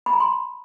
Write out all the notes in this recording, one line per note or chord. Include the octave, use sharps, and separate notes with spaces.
B5
A#5
C6